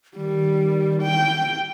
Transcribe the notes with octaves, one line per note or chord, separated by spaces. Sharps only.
D#3 G3
G5